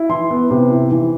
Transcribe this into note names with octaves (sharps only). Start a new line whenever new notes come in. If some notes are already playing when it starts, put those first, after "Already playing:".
Already playing: E4
E3 C6
B3
C3
E4
E3